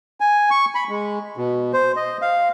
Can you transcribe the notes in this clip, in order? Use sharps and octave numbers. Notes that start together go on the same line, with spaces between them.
G#5
C#6
B5
G#3
B2
C5
D#5
F5